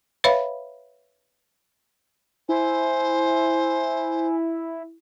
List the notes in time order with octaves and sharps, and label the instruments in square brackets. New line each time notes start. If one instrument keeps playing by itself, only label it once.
[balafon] B4 C#5 E5 F5 B5
[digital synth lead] E4 [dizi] C5 [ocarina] G#5